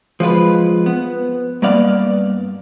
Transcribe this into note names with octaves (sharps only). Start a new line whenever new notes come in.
F3 G#3 F4 B4
B3
G2 A#3 B3 D5 F5